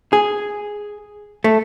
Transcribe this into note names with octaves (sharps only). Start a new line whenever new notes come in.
G#4
A3